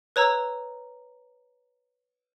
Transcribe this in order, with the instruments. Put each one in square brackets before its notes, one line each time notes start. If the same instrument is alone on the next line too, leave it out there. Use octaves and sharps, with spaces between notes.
[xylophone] B4 C#5 A#5 E6